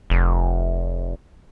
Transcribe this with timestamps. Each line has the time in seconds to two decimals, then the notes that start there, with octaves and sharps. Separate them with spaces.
0.10 F1